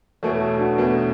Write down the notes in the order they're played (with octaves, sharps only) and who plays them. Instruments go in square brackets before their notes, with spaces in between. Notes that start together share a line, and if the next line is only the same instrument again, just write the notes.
[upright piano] E2 B2 A3 [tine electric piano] A4 C#5
[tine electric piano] F#4 A4
D4 F#4
[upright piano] E2 B2 A3 [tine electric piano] B3 D4